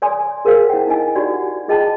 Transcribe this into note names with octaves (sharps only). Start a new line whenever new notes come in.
C#5 D5 G#5 C6 D#6
G#4 A#4 C5 C#5 F5 F#5
E4 G5
D#4 E4 D#5 G#5
D#4 F#4 G4 D5 F#5
F4 G#4 D#5 G5 A5